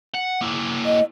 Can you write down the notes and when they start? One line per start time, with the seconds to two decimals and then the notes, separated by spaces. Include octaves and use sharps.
0.14 F#5
0.41 A#3 E4
0.85 D#5